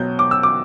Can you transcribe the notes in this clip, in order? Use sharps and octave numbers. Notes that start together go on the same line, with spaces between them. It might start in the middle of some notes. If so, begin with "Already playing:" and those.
Already playing: B2 F#3 G6
D6
E6
D6